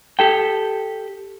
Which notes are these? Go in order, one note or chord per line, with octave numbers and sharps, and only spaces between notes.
G4 A4 G5